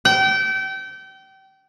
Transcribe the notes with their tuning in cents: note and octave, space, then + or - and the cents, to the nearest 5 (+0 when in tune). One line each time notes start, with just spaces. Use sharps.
G5 -30